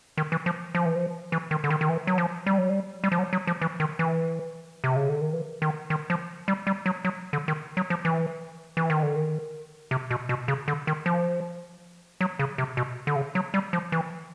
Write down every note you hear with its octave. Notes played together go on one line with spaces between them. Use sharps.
D#3
E3
F3
F3
E3
F3
E3
D#3
D3
D#3
D#3
E3
F#3
F3
G3
F#3
G3
G3
F3
F#3
F#3
F3
E3
D#3
E3
C3
C#3
D3
D#3
E3
D#3
D#3
F3
G3
G3
F#3
F#3
D3
D#3
F#3
F3
E3
E3
D#3
D3
D#3
C3
B2
B2
C#3
D3
D#3
F3
F#3
C#3
C3
B2
D3
C#3
F#3
G3
F3
E3